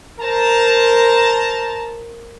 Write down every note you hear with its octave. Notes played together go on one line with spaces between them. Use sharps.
A#4 C5 A5 A#5